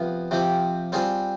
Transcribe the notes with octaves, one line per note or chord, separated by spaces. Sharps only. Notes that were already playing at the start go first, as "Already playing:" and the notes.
Already playing: C3 F3 B3 F4
C3 F3 C4 G4
G3 C4 F4 G#4 C5